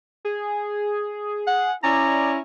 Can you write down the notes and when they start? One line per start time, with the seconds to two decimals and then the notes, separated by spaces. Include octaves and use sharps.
0.25 G#4
1.47 F#5
1.83 C#4 E4 D5 A#5